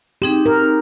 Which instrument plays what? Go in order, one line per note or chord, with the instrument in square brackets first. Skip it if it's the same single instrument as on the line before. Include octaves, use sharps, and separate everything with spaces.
[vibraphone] C4 D#4 G#4 [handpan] G4
[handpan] A#4